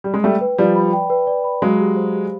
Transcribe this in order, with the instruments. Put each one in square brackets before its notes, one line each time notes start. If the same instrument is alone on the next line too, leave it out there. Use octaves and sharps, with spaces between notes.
[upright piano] G3
G#3
[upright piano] G3 A3 [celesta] G5
[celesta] B4
[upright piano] F3 G3 [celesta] D5
[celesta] B5
G5
B4
D5
B5
[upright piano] F#3 G#3 [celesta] F5
[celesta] G4
C5
G4